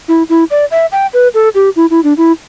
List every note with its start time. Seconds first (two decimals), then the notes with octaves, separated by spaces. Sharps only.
0.08 E4
0.29 E4
0.51 D5
0.71 E5
0.92 G5
1.13 B4
1.34 A4
1.55 G4
1.76 E4
1.90 E4
2.04 D4
2.17 E4